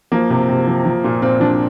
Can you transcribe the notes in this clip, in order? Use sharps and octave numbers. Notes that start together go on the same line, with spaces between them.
F3 A#3
C3
C3
F3
F3
A#2
A#2 C4
F3 D4